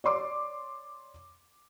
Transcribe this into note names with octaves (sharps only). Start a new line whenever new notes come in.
C#5 D5 C6 D6